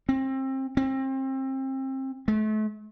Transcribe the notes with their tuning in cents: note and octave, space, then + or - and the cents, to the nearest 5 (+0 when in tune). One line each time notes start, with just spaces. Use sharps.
C4 +30
C4 +30
A3 -35